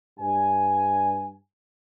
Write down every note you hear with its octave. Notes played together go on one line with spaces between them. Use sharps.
G2 G#5